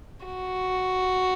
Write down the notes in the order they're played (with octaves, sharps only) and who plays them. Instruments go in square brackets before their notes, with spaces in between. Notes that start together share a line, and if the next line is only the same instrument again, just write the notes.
[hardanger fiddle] F#4